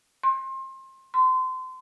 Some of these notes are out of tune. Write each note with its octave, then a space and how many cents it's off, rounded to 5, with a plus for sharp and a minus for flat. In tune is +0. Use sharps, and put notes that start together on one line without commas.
C6 +30
C6 -30